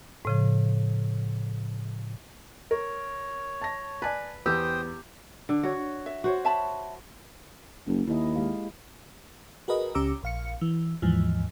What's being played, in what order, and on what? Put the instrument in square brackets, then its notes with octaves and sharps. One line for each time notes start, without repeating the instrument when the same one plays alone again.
[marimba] A2 C#3 F3
[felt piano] A#4 [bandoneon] C#5
[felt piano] A5 A#6
[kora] B4 [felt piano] D5 G#5 A5
[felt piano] E2 B3 E6 [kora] G4 [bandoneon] C5 G5 D#6
[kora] D3
F#4 C#5
[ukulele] E5
[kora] F#4 C5 C#5
[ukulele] E5 A5 B5
[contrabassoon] F#1 [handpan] A#3
[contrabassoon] D#2 [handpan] E4 D#5
[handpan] G#3 G4 F5
[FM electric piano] F#4 G#4 A#4 B4 D#5
C#2 C#4 G4 A#5 D6 E6
A#1 F5 C#7
E3
D#2 G#2 E3 F3